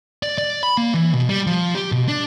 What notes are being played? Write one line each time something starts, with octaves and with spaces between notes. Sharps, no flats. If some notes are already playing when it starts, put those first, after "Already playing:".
D5
D5
B5
A#3
E3
B2
G3
F3
G4
B2
D4